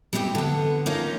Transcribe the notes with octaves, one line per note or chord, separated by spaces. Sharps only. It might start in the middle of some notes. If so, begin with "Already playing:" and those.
G3 B3 C4 E4 G4
D3 B3
A#3 C#4 D#4 F4